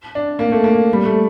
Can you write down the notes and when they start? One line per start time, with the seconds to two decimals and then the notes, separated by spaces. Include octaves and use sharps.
0.15 D4
0.39 A#3
0.52 A3
0.64 A#3
0.93 G3
1.05 A3